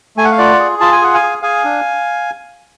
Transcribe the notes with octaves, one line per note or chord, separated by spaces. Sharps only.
A3 G#5
F#5
F5
F4 D5 F#5
G#4
F4 A5
G#5
G#4 F#5
F5 G#5
G#4
G#4 F5 G#5
D4